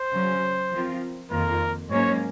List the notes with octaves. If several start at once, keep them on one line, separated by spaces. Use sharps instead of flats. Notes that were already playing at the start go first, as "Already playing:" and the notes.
Already playing: C5
C#3 F#3 C#4
F3 C4 F4 A#4
F2 D#3 A#3 F4 A#4
G#2 F#3 A#3 C#4 C#5